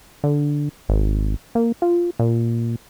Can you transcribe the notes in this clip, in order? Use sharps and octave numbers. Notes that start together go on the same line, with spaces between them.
D3
G#1
A#3
F4
A#2